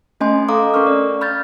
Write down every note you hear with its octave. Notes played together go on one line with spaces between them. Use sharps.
A3 C#4 D#5 G#5 C6
A4 F5 A#5 D6 D#6
C#4 A#4 C#6 F6
D5
B5 F6 G6 A6